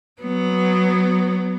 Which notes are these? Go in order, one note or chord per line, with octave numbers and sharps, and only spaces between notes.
F#3 B3